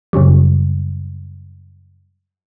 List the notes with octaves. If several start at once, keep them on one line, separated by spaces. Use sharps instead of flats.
F#2 C#3 F#3 G3